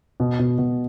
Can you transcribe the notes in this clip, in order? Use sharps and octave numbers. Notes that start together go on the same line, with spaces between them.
B2
B2
B2